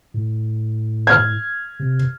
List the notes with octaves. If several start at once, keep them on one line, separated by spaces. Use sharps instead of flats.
A2
F6 G#6
C3